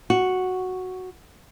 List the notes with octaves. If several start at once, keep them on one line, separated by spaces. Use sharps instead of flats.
F#4